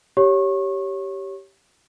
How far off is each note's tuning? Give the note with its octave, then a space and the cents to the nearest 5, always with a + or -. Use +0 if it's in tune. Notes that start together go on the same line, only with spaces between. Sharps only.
G4 -5 C#5 +0 C#6 -30